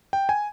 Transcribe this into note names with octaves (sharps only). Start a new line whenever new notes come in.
G5
G#5